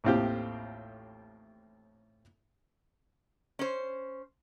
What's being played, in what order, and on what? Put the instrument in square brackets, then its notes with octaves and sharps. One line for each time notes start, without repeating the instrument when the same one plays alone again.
[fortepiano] A1 D#2 A2 C4 F4 G4
[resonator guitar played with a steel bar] C#4 C5